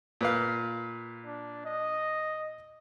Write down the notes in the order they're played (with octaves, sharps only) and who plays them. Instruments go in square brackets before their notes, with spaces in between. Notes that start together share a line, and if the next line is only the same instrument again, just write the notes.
[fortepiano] A#2 B4 F5
[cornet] D4
D#5